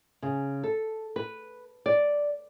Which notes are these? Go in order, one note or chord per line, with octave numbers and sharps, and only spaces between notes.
C#3
A4
B4
D5